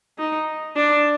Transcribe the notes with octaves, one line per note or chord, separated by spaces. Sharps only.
D#4
D4